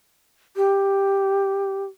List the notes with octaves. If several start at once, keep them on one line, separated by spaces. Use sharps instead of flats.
G4